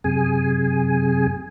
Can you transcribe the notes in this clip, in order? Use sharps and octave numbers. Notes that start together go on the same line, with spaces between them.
F#2 C3 G#4 G#5